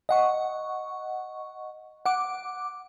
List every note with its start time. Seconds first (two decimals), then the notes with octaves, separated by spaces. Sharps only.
0.09 D#5 F#5 C#6
2.06 F#5 D6